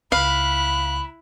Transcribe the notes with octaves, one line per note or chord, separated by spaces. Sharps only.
C#2 E4 F5 B5 F#6